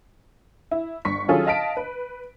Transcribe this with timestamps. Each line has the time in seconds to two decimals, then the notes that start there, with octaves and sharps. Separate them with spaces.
0.71 E4
1.05 G1 C#6 B6
1.28 D#3 F#3 C#4 F4 G#4 A4
1.46 D#5 F5 A5 B6 D7
1.77 B4